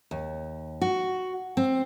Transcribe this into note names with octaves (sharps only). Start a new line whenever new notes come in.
D#2
F#4
C4